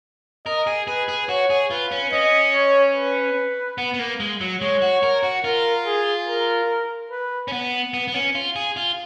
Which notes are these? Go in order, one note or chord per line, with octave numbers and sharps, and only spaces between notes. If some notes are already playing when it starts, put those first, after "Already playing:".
A#4 D#5
G#4
G#4 B4
G#4
F#4 C#5
G#4
F4 B4
C#4
C#4 D#5
C#5
B4
B3
B3
A#3
G#3
F#3
G#3 C#5
F#4
A#4
F#4
F4 A#4
G#4
A#4
B4
C#4
B3
B3
B3
C#4
F4
G#4
F4